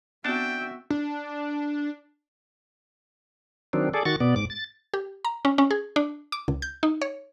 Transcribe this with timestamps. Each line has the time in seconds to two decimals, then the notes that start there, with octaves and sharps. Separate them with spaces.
0.25 B3 C4 D4 F#4 E5 G5 A5
0.90 D4
3.73 D#3 F#3 C4 D4
3.94 G#4 A4 D5
4.05 D#3 F#4 C#6 A6
4.20 B2 B3 D5
4.36 G#2 D6
4.50 A6
4.94 G4
5.25 A#5
5.45 C#4
5.58 C#4
5.71 G#4
5.96 D4
6.32 D6
6.48 C#2
6.62 G6
6.83 D#4
7.02 C#5